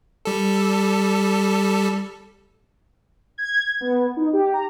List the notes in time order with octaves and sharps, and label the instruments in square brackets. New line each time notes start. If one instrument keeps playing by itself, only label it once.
[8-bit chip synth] G3 A4
[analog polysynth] G#6
B3
D#4
G4
A#5